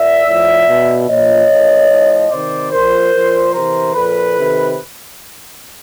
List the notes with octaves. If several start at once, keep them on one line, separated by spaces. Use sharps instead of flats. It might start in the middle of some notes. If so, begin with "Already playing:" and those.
Already playing: A#2 D5 E5
A2 F3
B2
A#2 F3 C#5 D#5
A#2 F3
A2 F3
C3 D#3 C5 D5
A#2 F3 A#4 C5
A#2 F3
C3 E3 A#4 C5
A#2 F3 A4 B4
C3 D#3